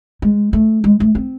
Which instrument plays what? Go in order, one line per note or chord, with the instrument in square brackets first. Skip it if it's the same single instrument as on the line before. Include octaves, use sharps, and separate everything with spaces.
[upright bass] G#3
A3
G#3
A3
C4